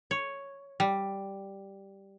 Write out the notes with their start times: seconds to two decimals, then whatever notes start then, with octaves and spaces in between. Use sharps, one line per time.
0.11 C#5
0.80 G3